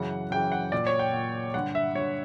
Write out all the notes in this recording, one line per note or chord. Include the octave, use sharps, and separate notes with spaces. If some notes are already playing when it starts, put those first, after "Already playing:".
Already playing: F#2 C#3 E3 F#5
F#2 C#3 E3 G5
F#5
A#2 D5
C#5
G5
A#2
G2 D3 F#5
E5
G2 D3 C#5